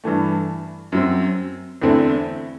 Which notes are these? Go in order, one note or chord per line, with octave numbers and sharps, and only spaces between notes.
G2 E3 A3
F#2 F#3 C4
E2 D3 A3 C4 E4